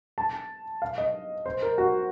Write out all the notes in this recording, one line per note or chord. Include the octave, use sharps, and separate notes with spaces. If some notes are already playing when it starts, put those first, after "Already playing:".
A5
F5
D#5
C5
A#4
F#4